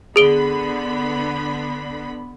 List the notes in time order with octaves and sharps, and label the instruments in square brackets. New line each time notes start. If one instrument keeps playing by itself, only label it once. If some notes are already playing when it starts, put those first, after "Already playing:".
[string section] D3 B3 B5 [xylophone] G#4 D7 G7